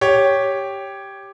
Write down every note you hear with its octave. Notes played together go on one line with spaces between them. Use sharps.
G4 C#5